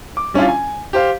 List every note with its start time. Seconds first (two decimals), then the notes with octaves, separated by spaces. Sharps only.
0.17 D6
0.34 G3 C#4 D4 E4 F4
0.48 G#5
0.93 G4 C5 F5